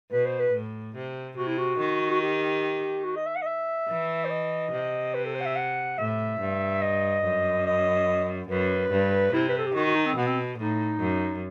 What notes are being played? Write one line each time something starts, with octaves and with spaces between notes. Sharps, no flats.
B2 B4
C5
B4
A2
C3
C3 F#4
E4
F#4
D#3
F#4
G4
F#4
D#5
E5
F#5
D#5
E5
E3
C5
D#5
C3
B4
A4
C5
F#5
E5
F#5
A2 E5
G2
D#5
F#2
D#5
F#2 B4
G2
C3 E4
B4
A4
G4
D#3 F#4
F#4
D#4
C4
B2 B3
C4
A2 D#4
F#2